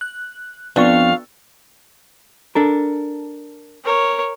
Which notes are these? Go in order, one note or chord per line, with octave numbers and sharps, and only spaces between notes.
F#6
F2 B3 D4 F5 C#6
D4 A4 A#4
A#4 C#5